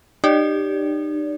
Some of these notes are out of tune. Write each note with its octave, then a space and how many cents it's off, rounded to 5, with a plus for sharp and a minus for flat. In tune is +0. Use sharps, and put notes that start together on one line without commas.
D#4 -40 G4 +0 D5 -30